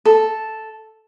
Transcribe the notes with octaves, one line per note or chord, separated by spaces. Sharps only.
A4